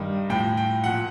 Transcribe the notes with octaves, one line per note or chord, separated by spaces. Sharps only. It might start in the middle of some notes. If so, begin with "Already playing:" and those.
Already playing: G2 D#3 G3
A2 F3 G5
G5
A#2 F3 F#5